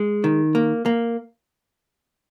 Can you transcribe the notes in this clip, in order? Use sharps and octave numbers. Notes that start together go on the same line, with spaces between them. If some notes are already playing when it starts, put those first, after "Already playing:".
Already playing: G#3
D#3
A#3
A#3